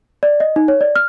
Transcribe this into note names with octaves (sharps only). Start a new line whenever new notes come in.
D5
D#5
D#4
C#5
D5
F6